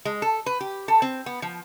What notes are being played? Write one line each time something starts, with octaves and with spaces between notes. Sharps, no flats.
G#3
A4
B4
G4
A4
C4
B3
F3